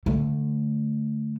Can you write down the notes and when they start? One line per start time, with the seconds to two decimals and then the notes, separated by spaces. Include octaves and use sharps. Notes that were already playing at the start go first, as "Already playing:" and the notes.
0.06 D3 A3